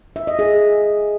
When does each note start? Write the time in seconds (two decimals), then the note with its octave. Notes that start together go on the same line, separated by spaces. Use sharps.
0.16 E5
0.27 D#5
0.39 G#4